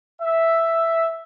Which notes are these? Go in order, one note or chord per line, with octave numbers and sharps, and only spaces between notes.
E5